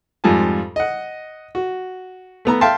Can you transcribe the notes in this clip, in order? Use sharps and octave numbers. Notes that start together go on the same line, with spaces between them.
F2 G#2 G3 F4 G#5 A5
D#5 F#5
F#4
A3 B3 A#5
E5 F5 G5 A5 C6